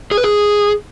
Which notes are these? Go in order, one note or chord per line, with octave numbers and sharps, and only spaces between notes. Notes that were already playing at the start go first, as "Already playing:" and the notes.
G#4
B4
G#4